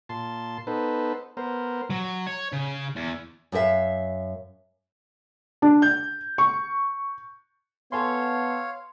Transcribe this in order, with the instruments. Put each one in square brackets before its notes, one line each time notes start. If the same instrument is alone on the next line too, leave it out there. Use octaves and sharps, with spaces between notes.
[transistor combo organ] A#2 A5 C6
B3 D#4 A4 B4 C5
B3 A#4 C5
[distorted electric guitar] F#3
C#5
C#3
E2
[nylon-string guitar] F#2 F4 A#4 E5 F5
[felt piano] D4
G6
C#6
[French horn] B3 [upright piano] A4 G#5 B5 [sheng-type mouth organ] C#5 F5 [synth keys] C6